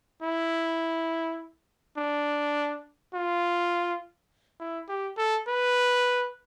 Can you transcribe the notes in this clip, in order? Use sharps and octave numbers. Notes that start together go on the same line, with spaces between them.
E4
D4
F4
E4
G4
A4
B4